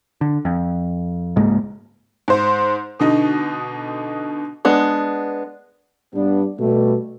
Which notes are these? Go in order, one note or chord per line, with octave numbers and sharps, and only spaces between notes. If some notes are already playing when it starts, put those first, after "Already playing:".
D3
F2
C#2 G#2 G#3 A#3
G#2 C5
B2 D3 D#4
G#3 B3 D4
G2 B3 D4
B2 G3 A3